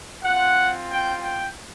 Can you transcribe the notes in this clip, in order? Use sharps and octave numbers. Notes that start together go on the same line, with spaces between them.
C4 F4 F#5
G5
G5